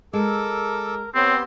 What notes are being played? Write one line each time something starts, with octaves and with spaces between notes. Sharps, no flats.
G#3 A4 A#4 D6 E6
B3 C4 G4 C#5 C6